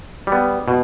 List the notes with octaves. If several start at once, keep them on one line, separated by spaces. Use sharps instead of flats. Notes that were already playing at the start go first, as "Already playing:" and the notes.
G3 B3
B2